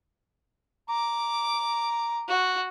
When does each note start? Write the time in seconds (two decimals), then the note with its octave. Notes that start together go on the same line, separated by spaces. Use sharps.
0.89 A#5 D6
2.28 F#4